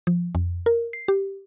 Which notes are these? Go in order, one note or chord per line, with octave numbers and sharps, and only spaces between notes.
F3
F2
A#4
C7
G4